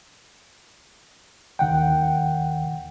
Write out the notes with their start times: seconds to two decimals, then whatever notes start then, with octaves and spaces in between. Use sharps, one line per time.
1.59 D#2 D#3 F#5 G5